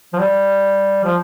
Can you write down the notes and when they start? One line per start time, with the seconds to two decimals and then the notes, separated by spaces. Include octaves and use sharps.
0.13 F3
0.19 G3
1.04 F3